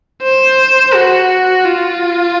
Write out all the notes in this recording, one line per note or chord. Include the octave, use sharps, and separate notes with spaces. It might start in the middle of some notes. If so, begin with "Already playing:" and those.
C5
F#4
F4